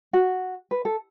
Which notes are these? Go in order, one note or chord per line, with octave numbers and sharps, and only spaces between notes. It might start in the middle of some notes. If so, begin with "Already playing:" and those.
F#4
B4
A4